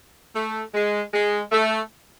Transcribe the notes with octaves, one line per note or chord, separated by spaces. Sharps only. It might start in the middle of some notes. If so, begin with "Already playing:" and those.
A3
G#3
G#3
A3